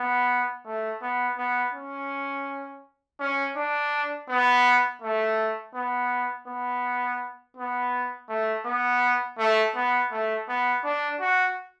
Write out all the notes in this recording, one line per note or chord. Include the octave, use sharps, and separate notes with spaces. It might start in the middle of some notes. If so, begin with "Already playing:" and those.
Already playing: B3
A3
B3
B3
C#4
C#4
D4
B3
A3
B3
B3
B3
A3
B3
A3
B3
A3
B3
D4
F#4